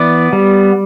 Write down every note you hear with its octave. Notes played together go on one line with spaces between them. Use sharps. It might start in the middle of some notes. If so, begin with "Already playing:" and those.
Already playing: E3 B3 D5
G3